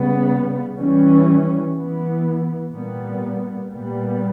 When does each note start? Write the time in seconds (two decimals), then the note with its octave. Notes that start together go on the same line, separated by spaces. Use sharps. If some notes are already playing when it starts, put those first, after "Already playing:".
Already playing: C#3 G3 B3
0.78 E3 G3 C#4
1.76 E3 B3
2.72 A#2 G3 B3
3.70 A#2 G3 B3